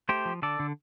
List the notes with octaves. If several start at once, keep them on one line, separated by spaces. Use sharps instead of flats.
A3 G4 C5
F3
D3 A4 D5
D3